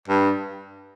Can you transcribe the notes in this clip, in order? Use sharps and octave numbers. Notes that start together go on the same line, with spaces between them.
G2